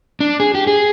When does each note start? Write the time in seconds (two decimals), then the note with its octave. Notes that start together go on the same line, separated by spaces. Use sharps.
0.20 D4
0.40 G#4
0.55 G4
0.67 G#4